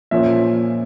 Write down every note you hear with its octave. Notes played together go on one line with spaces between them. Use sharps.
A#2 F3 A#3 C#4 E5